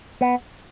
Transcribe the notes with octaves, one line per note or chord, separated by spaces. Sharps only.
B3